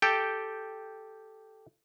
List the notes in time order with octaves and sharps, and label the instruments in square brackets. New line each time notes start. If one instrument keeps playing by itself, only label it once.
[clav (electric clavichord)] G4 A4 G5